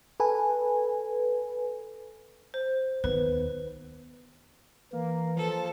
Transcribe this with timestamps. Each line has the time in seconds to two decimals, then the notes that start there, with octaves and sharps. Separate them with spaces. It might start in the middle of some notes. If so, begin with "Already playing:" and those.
0.20 A4 B4 G#5
2.54 C5
3.04 D#2 B3 B4
4.93 E3 A#3
5.37 F3 A4